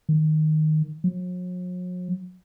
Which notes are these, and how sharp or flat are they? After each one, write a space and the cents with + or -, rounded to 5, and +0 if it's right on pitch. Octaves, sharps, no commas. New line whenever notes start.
D#3 -5
F#3 -45